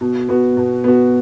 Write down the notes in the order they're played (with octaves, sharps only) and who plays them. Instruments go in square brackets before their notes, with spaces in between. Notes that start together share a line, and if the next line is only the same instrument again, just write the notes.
[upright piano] B2
B3 F#4
B2
B3 F#4